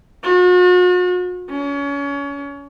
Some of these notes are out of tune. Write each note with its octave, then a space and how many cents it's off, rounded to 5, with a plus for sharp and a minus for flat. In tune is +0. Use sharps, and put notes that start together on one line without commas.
F#4 -45
C#4 +30